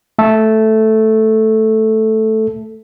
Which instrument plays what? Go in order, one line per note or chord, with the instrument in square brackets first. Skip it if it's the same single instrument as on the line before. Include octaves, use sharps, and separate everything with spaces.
[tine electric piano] A3 A4